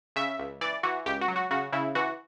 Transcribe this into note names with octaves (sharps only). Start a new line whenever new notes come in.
C#3 E5
C#2
E3 D5
E3 F#4
C#2 G4
F#4
F#3
F#4
C#3 F#4
C#3 E4
E3 F#4